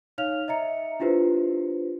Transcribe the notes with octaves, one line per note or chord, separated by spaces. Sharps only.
D#4 C#5 F5 F6 F7
D#5 E5 A#5 C#7
D4 E4 F4 G4 B4 C5